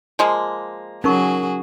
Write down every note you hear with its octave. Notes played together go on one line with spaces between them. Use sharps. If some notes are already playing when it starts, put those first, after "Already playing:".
F3 G#3 A#3
F#3 C#4 D#4 F#4 G#4 A#4 C#6